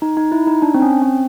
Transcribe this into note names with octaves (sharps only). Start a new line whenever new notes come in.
D#4
D#4
E4
D#4
D4
C4
C#4
C4